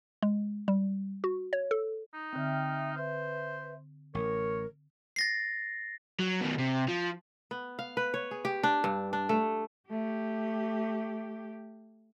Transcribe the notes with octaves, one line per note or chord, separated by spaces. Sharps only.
G#3
G3
F#4
C#5
A4
D#4
D3 C4 E5 G5 F6
B4 C5 E5
A1 A#4 C#5
A6 A#6 C7
F#3
B2 D#3
C3
F3
B3
F5
B4
C#5
G#4
G4
D4
G2
D4
A3
A3 G4